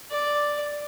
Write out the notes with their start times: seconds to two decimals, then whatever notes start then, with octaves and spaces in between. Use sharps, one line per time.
0.11 D5